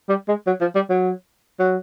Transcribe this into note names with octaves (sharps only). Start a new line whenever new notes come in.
G3
G#3
F#3
F3
G3
F#3
F#3